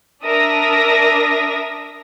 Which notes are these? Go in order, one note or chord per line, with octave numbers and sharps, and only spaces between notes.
D4 A#4 E5 D#6 A#6